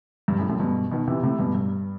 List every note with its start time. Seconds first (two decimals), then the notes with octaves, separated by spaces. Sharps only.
0.28 G2
0.38 F#2 A2
0.49 F#2 A2
0.60 G2 B2
0.91 B2 D#3
1.07 C3 E3
1.23 A2 C3
1.39 G2 B2
1.55 G2